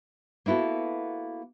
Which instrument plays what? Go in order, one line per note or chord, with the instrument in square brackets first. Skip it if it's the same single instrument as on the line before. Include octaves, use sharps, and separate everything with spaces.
[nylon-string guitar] A#3 B3 E4 F#4 A4